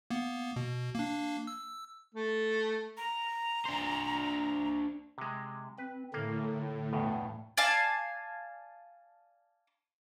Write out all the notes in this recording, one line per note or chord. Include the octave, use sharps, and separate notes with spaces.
A#3 B3
B2
A#3 D4
E6
A3
A#5
D4 C5
C3 G#3
C4 B4
A2 D3 A#3
E2 G2 B2
D5 F5 G#5 A5